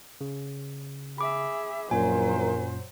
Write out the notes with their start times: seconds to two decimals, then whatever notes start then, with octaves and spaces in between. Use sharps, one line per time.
0.21 C#3
1.18 G#4 E5 B5 D6
1.91 A#1 F#2 A#2 E3 F#3 A#4 C5 G#5